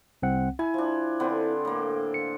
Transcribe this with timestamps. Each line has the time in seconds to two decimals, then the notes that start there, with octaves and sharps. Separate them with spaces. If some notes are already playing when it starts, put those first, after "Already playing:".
0.22 C2 C4 F#5
0.59 E4 G#5
0.74 F3 D4
1.20 D3 B3 C4
1.65 A2 A#3
2.14 C#7